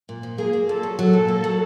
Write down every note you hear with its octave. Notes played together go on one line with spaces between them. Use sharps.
A#2
F3
A#3 G#4
A#3
A#2 A4
F#3
F#3 A4
A#2
A#3
F#3